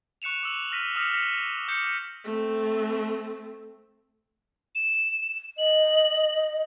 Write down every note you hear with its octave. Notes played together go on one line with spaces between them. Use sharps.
C#6 F#6 C#7 E7 F7
D6 E6 F#7
F6 A#6 B6 D#7
D6 D#6 F6 A#6 B6 C#7
F6 A#6 B6 C#7
D6 G6 C#7
A3 C4
E7
D#5 F#7